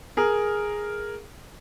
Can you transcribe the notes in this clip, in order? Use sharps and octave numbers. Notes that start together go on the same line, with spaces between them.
G#4 A#4